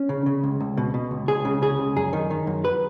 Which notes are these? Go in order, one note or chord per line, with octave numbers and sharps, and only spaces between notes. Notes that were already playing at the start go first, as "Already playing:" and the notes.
Already playing: C#4
C#3
C#3
C#2
C#2
B2
B2
C#2
C#2 G#4
C#3
C#3 G#4
C#2
F#2 G#4
D#3
D#3
F#2
B4